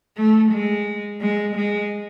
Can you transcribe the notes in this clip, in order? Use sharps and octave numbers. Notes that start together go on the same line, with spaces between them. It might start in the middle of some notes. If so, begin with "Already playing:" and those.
A3
G#3
G#3
G#3